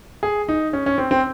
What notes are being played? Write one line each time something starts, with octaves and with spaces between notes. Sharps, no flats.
G#4
D#4
C#4
C#4
C4
C4